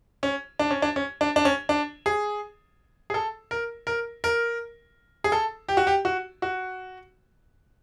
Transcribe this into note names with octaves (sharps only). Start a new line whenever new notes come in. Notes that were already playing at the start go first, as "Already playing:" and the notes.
C#4
D4
C#4
D4
C#4
D4
D4
C#4
D4
G#4
G#4
A4
A#4
A#4
A#4
G#4
A4
G4
F#4
G4
F#4
F#4